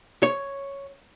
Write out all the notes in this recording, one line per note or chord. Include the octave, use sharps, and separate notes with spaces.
C#5